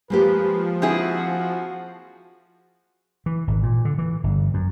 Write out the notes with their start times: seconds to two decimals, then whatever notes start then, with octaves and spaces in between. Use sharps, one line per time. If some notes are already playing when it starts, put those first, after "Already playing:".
0.10 F3 G#3 A#3 G4 B4
0.82 C4 E4 F#4 G#4
3.26 E3
3.47 G#1
3.63 A#2
3.85 D3
3.99 E3
4.24 G1
4.54 F#2